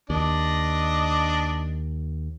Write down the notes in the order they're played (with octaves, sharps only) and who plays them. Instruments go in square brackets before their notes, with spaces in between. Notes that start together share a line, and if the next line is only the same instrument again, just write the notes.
[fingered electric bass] D#2 [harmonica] D4 D#5